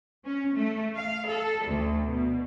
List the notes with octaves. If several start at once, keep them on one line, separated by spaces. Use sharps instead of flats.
C#4
A3
F5
A4
D2
B2